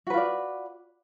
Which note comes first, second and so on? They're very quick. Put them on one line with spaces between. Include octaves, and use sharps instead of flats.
F#4 B4 F4 D5